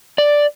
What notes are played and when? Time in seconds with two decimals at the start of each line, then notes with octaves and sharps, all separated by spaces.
0.18 D5